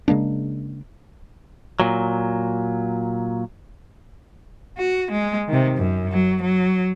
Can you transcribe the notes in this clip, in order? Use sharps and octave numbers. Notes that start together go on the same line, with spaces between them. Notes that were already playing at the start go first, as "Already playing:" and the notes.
C#3 G#3 A#3 D4
A#2 F#3
F#4
G#3
C3 D#3
F#2
F#3
F#3